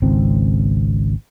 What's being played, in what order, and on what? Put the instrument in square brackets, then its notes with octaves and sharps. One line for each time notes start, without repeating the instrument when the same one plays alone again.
[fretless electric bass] G#1 C#2 C4